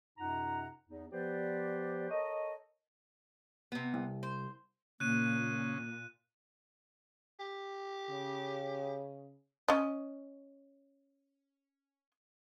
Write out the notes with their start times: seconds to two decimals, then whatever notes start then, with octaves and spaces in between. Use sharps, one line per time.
0.18 F#2 C3 D#4 F4 F#5 A#5
0.89 E2 D#4
1.11 F3 B3 G4 B4 C5 D5
2.09 A4 A#4 C#5 D#5
3.72 C3 B3
3.94 C2
4.23 C5
5.00 A#2 C#3 A#3 F#6 D#7
7.40 G4
8.10 C#3
9.68 C#4 D#5